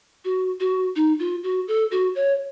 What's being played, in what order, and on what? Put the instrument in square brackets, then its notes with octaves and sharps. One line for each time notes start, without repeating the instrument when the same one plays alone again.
[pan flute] F#4
F#4
D#4
F4
F#4
A4
F#4
C#5